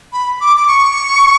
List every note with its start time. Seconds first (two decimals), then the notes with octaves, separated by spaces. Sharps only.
0.13 B5
0.40 D6
0.57 D6
0.68 C#6